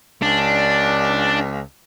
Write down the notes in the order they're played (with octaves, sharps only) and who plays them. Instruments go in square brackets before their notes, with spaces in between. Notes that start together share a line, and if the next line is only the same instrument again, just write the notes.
[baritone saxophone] C#2 [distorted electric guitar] D4